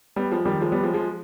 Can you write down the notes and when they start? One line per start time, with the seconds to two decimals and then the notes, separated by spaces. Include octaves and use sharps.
0.16 G3 B3
0.32 F3 G#3
0.45 D#3 G3
0.61 F3 G#3
0.72 G3 B3
0.83 F3 G#3
0.94 F3 G#3